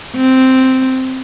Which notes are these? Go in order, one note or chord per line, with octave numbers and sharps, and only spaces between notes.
C4